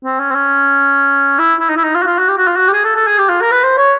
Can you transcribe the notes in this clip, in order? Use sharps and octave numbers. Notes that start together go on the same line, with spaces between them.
C4
C#4
C4
C#4
E4
E4
D#4
E4
D#4
F4
F#4
F4
F#4
G4
F#4
F4
F#4
G4
G#4
A4
A4
G#4
G4
F4
A#4
B4
C5
C#5